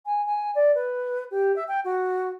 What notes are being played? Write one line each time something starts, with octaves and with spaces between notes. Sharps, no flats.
G#5
G#5
D5
B4
G4
E5
G5
F#4